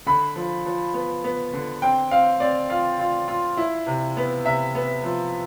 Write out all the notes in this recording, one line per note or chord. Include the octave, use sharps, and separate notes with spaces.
D3 B5
F3
F3
B3
B3
D3
C4 G5
C4 F5
C4 D5
F4 F5
F4
F4
E4
C3
B3
C3 E5
B3
F3